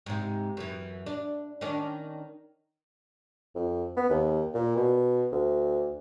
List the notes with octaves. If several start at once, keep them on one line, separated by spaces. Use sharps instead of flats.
G#2 C3
F#2 E3
D4
D#3 C#4 D4
F2
B3
D#2
A#2
B2
D2